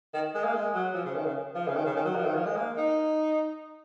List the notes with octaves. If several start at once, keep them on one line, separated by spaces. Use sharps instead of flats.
D#3
G#3
A#3
G#3
F#3
F3
C#3
D#3
C#3
F3
C#3
D#3
C#3
D#3
F#3
F3
D#3
F3
G#3
A#3
D#4